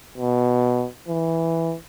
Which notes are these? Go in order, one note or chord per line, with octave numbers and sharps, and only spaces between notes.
B2
E3